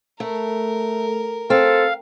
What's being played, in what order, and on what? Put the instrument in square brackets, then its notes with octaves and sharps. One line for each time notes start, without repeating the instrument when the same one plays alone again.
[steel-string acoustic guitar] A3 [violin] A#4
[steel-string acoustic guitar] C4 [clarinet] A4 [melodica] F5